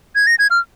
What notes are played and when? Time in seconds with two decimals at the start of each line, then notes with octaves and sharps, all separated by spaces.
0.16 G#6
0.27 A#6
0.39 G#6
0.51 F6